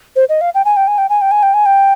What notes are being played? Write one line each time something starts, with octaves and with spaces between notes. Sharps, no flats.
C5
D#5
F5
G5
G#5
G5
G#5
G5
G#5
G5
G#5
G5
G#5
G5